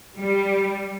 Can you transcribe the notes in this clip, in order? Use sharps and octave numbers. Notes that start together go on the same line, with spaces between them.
G3